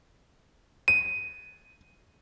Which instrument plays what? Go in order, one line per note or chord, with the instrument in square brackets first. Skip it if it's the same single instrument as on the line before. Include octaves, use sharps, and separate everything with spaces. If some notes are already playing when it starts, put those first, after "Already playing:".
[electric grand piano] D#7